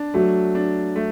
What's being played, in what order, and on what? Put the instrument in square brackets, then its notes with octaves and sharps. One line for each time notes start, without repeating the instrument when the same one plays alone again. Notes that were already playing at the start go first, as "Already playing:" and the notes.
Already playing: [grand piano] D4
[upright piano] F#3 [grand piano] A3
[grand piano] D4
A3